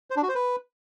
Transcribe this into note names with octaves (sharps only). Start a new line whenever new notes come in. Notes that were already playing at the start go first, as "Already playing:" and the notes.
C5
D4
F#4
C5
B4